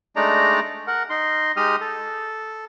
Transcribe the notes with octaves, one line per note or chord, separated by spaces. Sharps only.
G#3 A3 D4 D#4 D5 A#5
A#4 F#5
D#4 C6
G#3 D#4 G4 D#5 D#6 F6
A4